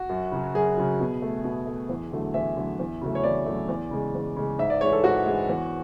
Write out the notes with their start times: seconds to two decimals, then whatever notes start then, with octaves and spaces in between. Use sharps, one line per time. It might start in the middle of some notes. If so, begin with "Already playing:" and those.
Already playing: F#4
0.09 F#2
0.32 C#3 F#3
0.55 F#2 G#4
0.77 C#3 F#3
1.00 B2
1.22 A3
1.44 B2
1.67 A3
1.89 E2
2.12 D3 F#3 A3
2.34 E2 E5
2.57 D3 F#3 A3
2.79 E2
3.01 C#3 F#3 A3
3.15 C#5
3.24 E2 D5
3.46 C#3 F#3 A3
3.69 E2
3.91 C#3 G#3
4.15 E2
4.36 C#3 G#3
4.59 G#2 E5
4.70 D5
4.81 E3 G#3 C#5
4.93 A4
5.04 G#2 F#4
5.26 E3 G#3
5.49 E2